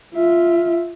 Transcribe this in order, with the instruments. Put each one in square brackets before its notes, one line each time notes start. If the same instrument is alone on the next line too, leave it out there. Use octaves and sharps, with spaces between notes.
[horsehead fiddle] F4 E5